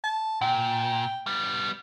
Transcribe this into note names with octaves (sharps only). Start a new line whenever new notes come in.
A5
A#2 G5
G3 B3